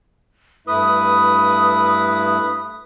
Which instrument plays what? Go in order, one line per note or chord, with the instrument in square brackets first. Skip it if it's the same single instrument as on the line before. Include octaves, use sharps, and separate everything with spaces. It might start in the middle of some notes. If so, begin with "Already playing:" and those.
[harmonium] G2 A3 E4 [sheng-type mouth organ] B4 [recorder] D#6